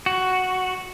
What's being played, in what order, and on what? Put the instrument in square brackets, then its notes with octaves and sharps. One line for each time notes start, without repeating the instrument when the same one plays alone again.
[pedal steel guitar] F#4